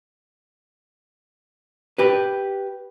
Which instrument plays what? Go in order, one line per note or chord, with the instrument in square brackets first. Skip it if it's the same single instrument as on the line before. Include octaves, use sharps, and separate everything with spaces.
[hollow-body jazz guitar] G4 B4